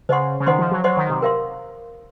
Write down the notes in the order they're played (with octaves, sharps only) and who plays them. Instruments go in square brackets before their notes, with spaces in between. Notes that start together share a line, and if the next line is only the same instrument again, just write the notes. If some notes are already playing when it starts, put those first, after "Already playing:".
[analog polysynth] C#3 [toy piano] C5 D#5 F#5 C6
[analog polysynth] C#3
[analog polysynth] D#3 [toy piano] C5 D#5 F#5 C6
[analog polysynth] F3
F#3
[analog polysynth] F#3 [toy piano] C5 D#5 F#5 C6
[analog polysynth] D#3
C3
[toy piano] A#4 F5 C6